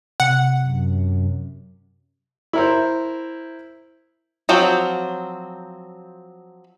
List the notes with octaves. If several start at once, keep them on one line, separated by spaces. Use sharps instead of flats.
C3 F#5
F#2
E4 A#4 C5
F3 F#3 C4